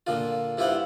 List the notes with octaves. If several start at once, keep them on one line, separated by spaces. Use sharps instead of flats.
A#2 D3 F4
G2 E4 F4 G4 C5 F#5